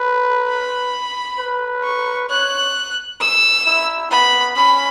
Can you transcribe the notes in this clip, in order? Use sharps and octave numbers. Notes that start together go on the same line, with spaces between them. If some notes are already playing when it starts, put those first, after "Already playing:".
Already playing: B4
B5
B4
C#6
C#5 F#6
E6
E4
B3 B5
C#4 B5